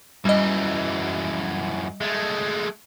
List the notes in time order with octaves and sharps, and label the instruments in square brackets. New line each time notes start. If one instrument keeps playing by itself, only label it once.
[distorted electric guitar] F#2 E3 [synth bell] G3 D#5
[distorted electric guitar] G#3 A3